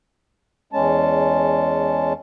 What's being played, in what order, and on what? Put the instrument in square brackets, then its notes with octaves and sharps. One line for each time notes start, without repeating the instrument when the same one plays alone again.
[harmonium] E2 G#3 C#4 A5